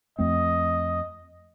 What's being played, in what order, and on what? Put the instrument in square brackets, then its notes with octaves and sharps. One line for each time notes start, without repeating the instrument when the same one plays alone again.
[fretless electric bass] F2 A3 C4 [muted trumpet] D#5